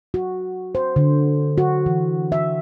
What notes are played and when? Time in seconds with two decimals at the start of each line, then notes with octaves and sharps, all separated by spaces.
0.14 F#4
0.75 C5
0.96 D3
1.58 F#4
1.86 E3
2.32 E5